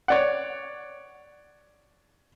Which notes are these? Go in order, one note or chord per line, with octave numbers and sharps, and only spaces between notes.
C#5 D5 F#5